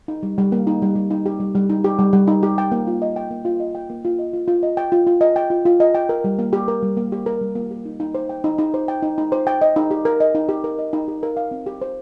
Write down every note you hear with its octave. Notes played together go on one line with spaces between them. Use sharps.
D#4
G3
G3
A#3
D#4
G3
G3
D#4
G4
G3
G3
D#4
G4
G3
G3
D#4
G4
G5
A#3
F4
D#5
G5
A#3
F4
D#5
G5
A#3
F4
D#5
F4
F4
D#5
G5
F4
F4
D#5
G5
F4
F4
D#5
G5
A#4
G3
A#3
G4
A#4
G3
A#3
G4
A#4
G3
A#3
G4
D#4
D#4
C5
G5
D#4
D#4
C5
G5
D#4
D#4
C5
G5
D#5
D#4
G4
A#4
D#5
D#4
G4
A#4
D#5
D#4
G4
A#4
F5
C4
G4
C5